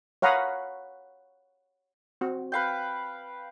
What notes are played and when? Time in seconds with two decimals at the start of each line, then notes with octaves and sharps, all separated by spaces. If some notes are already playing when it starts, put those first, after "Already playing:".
0.22 C#5 F5 F#5 A#5 B5 D#6
2.21 C4 F#4
2.52 B4 F5 G5